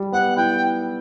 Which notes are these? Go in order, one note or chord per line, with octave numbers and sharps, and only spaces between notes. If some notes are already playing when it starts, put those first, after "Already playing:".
Already playing: G3
B3 F#5
E4 G5